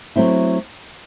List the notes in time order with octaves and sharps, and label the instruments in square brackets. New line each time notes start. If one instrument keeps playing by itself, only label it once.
[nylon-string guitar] F#3 A3 C4 E4